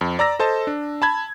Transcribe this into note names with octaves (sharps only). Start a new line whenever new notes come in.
F2
D5 A#5 E6 A#6
A4 C5 D#5 A5
D4
A5 B5 G#6